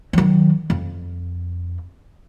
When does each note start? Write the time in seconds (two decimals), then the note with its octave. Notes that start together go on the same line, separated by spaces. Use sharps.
0.13 D#3 F#3
0.70 F2